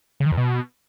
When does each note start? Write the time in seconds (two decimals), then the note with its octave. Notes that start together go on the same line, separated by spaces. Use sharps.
0.20 C#3
0.26 D#3
0.32 E2
0.37 B2